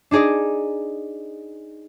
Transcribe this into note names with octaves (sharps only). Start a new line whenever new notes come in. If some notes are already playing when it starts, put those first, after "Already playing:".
D4 D#4 G#4 D5 D#5